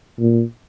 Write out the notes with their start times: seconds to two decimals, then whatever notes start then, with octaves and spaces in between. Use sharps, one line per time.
0.20 A#2